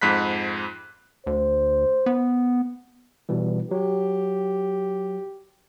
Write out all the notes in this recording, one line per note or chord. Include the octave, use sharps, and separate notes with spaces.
F2 G#2 B5 F#6 B6
D2 C5
B3
B2 E3 G3
F#3 G4